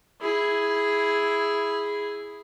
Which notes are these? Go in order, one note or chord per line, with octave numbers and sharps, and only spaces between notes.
E4 G#4